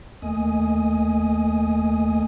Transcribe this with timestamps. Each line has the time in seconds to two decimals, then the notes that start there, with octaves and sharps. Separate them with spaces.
0.22 D#2 A3 A#3 D#5 G#5 D#6